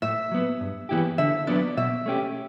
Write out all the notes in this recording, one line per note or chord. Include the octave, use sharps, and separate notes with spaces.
A2 E5
F#3 B3
G2
E3 B3 E4 G4
D3 E5
F#3 B3 D4 D5
B2 E5
A3 C#4 G4